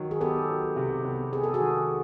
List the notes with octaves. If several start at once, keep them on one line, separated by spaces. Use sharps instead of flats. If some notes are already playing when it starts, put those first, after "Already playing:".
Already playing: D#3 F#3
G#4
B3 G4 A4
F#3
C3
B3
B3 G#4
A4
F#4 G#4
D#3